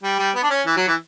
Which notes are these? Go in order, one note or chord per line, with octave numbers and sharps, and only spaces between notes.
G3
G3
B3
D4
C#4
E3
F#3
E3